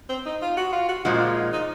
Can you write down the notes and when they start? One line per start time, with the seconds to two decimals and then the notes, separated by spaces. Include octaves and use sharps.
0.09 C4
0.26 D#4
0.42 F4
0.57 F#4
0.73 F4
0.89 F#4
1.05 A#2 F3 G#3 F#4
1.20 F4
1.36 D#4
1.53 D#4